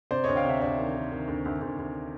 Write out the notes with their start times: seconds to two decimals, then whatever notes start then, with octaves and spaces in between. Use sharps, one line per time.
0.11 C3 C5 D5
0.24 D2 C#5 D#5
0.36 F5 G5
0.45 C3 E5 F#5
0.61 D2 D5 E5
0.78 D#3
0.94 D#3
1.11 D#3
1.28 D2
1.45 D2
1.61 D2
1.78 D2